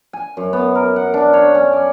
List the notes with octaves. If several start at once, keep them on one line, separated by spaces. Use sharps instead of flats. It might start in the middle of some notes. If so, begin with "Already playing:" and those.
G#5
F#2
B3
A#4
F#5
D4
C#5
C#4
D5